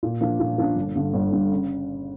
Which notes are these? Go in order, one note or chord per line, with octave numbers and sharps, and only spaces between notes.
A#2
F3 A#3 D4
A#2
F3 A#3 D4
G1
G2 D3
G1
G2 D3
C#3